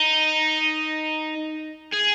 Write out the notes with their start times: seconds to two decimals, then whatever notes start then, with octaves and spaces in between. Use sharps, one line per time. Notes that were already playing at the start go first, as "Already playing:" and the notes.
Already playing: D#4
1.93 G#4